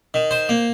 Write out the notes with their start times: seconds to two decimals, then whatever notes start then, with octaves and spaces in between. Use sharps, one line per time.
0.14 D#3
0.31 C5
0.49 A#3